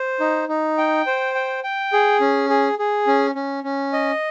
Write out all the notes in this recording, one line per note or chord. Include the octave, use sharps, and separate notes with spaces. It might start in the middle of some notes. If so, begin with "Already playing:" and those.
Already playing: C5
D#4
D#4
G5
C5
G5
G5
G#4
C#4
G#4
G#4
C#4
C#4
C#4
D#5